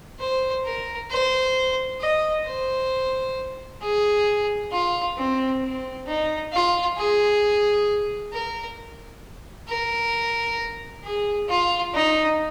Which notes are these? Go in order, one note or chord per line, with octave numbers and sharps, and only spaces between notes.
C5
A#4
C5
D#5
C5
G#4
F4
C4
C4
D#4
F4
G#4
A#4
A#4
G#4
F4
D#4